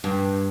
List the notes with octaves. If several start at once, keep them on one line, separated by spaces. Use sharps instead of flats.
G2